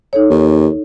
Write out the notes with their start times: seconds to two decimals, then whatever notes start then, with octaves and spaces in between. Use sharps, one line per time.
0.13 D#4 A4 C#5
0.30 D#2